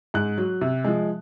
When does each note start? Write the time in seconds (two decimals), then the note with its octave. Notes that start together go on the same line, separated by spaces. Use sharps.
0.14 G#2 F#6
0.38 F#3
0.61 C3
0.84 F3 G#3